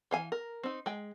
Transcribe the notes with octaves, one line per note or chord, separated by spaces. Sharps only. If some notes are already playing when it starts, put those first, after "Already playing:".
E3 F5 G#5
A#4
C4 D#4
G#3 G5